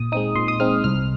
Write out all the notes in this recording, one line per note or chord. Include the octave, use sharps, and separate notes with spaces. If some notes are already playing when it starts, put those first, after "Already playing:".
Already playing: A#2 D#6
G#3 C4 D#4 D#6
A#2 C6
D#6
G#3 C4 D#4 F6
C2 F6